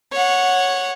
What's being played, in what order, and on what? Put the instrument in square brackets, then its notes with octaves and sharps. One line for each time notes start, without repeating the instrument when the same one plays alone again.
[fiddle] C#5 F#5